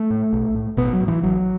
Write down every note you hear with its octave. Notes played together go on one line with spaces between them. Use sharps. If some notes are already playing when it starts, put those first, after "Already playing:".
Already playing: A3
A2
B1
A2
A1 B2 B3
F#3
A2
E3
A1 F#3